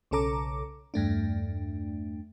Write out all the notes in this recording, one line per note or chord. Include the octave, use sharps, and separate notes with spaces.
B1 C#3 C#4 A4 A#5 D6
E2 G2 A3 D4